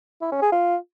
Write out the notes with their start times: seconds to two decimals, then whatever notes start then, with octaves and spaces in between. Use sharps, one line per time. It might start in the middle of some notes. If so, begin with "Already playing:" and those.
0.22 E4
0.32 C#4
0.42 G#4
0.52 F4